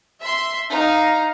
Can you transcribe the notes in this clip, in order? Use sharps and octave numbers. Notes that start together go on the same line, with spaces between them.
E5 C6
D#4 F5 A#5